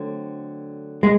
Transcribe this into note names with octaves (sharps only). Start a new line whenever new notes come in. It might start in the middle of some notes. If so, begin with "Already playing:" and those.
Already playing: D3 F#3 A3 C4
G#3